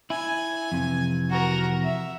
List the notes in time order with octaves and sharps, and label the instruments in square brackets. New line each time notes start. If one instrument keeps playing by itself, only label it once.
[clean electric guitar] E4 [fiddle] G#5
[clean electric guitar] F2 C3 E3
[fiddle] F#4 A#4
E5